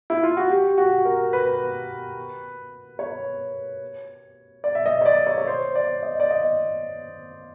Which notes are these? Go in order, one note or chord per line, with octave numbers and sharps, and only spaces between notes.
E4
F4
F#4
G4
F#4
A#4
B4
C#5
D5
E5
D#5
C#5
D5
C#5
C#5
C5
D5
D#5
D5
D#5